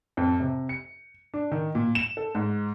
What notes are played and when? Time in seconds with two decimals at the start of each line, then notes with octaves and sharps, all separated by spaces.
0.17 F2
0.40 C3
0.69 C#7
1.34 D4
1.52 D#3
1.75 A#2
1.95 E7
2.17 A4
2.35 G#2